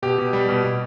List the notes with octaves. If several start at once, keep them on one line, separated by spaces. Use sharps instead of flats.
B2 G4
B2
G3
B2
B2